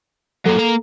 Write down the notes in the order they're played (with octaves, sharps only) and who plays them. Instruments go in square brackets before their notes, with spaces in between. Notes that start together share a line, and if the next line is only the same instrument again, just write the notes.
[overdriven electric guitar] F#3 A#3 [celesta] A4
[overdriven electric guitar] A#3 A#5